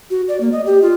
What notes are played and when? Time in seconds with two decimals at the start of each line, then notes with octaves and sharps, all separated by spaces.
0.10 F#4
0.28 D5
0.41 A#3
0.52 D#5
0.66 G4
0.82 F4